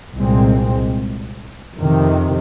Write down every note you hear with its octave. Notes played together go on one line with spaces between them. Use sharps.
C2 A#2 G#3 C4
F2 C3 D#3